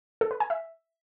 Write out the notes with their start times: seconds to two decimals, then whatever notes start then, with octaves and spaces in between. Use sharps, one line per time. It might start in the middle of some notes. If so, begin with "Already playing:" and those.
0.21 A4
0.31 B4
0.40 G#5
0.50 E5